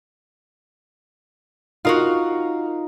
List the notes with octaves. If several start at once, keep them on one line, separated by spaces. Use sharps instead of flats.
D#4 F4 F#4 A#4 F5